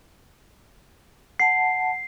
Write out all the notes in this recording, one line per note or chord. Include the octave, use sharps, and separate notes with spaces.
F#5 A5 C7